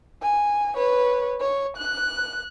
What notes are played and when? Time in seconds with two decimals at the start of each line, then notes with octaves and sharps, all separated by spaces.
0.22 G#5
0.76 B4 C#5
1.41 C#5
1.77 F#6